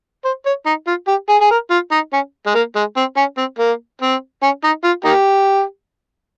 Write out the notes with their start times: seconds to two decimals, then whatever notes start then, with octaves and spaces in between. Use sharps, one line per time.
0.25 C5
0.46 C#5
0.66 D#4
0.87 F4
1.08 G4
1.29 G#4
1.41 G#4
1.51 A#4
1.71 F4
1.91 D#4
2.13 C#4
2.47 G#3
2.55 A#3
2.76 G#3
2.97 C4
3.17 C#4
3.38 C4
3.59 A#3
4.01 C4
4.42 C#4
4.64 D#4
4.84 F4
5.05 A#3 D#4 G4